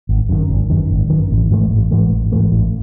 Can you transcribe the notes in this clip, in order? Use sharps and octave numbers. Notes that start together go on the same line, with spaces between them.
G#1
F#2 D#3
G#1
F#2 D#3
G#1
F#2 D#3
A1
G#2 E3 A3
A1
G#2 E3 A3
A1
G#2 E3 A3
A1